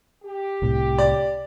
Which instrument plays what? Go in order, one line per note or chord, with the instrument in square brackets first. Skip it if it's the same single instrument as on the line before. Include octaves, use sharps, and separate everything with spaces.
[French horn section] G4
[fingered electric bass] C2 A2 C3
[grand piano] D5